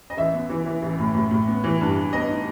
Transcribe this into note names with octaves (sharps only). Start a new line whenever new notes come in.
D#5
A1 E5
B3
E3
E3
A1
A2
A2
A2
B3
E3
G2
G2
B3 D#5
D#4